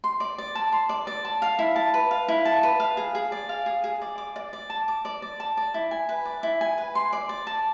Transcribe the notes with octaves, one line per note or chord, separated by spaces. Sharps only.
C6
D5
D5
A5
C6
D5
D5
A5
F5
E4
A5
B4
F5
E4
A5
B4
F5
G#4
G#4
D5
F5
G#4
G#4
D5
D6
D5
D5
A5
D6
D5
D5
A5
D5
E4
G#5
B4
D5
E4
G#5
B4
C6
D5
D5
A5